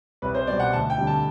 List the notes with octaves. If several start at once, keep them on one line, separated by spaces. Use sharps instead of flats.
C2 B4
C5
B2 G3 D5
F#5
D2 A5
G5
D3 G3
A5